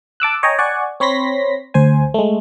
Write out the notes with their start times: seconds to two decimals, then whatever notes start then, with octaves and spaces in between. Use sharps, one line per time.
0.20 A5 D6 E6 F#6
0.43 C#5 D#5 G5 G#5 A#5
0.59 D5 F#5 G#5 C#6
1.00 C4 C#5 B5 C6 A#6 B6
1.74 D2 C5 G#5
2.14 G#3 A3